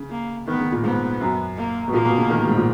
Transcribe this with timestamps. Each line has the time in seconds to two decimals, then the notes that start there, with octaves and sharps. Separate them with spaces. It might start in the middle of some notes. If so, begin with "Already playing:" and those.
Already playing: C#3
0.10 A#3
0.47 D#3 B3
0.59 C#3
0.72 A#2
0.84 G#2 B3
1.21 F#2
1.57 A#3
1.88 B2
1.93 A#2 A#3
2.05 B2
2.18 C#3
2.30 D#3
2.39 B2
2.48 G#2
2.58 A#2